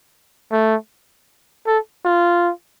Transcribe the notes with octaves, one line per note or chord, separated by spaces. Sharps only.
A3
A4
F4